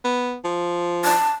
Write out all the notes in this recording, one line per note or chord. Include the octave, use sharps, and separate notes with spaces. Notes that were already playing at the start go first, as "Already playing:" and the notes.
B3
F3
A5